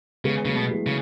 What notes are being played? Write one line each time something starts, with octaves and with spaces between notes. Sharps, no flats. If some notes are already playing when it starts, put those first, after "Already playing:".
C#3 G#3 B3
C#3 F#3 A3
B2
E3 G#3
C#3